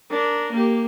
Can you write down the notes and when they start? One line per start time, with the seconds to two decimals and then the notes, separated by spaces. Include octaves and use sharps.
0.10 D4 A#4
0.51 A#3 G4